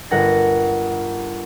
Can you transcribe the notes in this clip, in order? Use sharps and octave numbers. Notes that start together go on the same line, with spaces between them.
G1 A#4 F#5 A#5 A#6